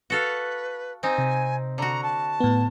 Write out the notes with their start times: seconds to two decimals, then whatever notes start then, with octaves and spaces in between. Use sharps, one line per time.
0.10 F#4 A4 B4 F5
1.03 C4 D#4 G#5
1.18 C3
1.78 D3 F#4 A#5
2.03 A5
2.40 A2 B3